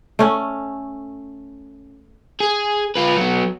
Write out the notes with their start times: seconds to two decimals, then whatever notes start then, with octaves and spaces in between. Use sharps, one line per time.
0.19 A3 C#4
2.40 G#4
2.96 F4 B4
3.17 F#3 B3